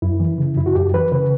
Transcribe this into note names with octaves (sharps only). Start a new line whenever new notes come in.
F#2 E4
E3
C#3
F#2 E4
F#4
F#2 G4
E3 B4
C#3 B4